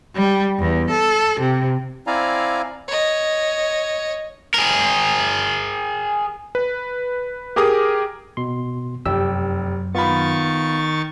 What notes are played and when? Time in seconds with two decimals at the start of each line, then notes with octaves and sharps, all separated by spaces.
0.16 G3
0.59 E2
0.91 A4
1.41 C3
2.07 C4 E4 D5 F5 G#5 A#5
2.88 C#5 D#5
4.54 G#4 A#4
6.55 B4
7.56 G4 G#4 A#4 D6 D#6
8.37 B2 C6
9.06 F1 F#2 G4 E6
9.95 D#3 B3 F4 B5 C#6 A6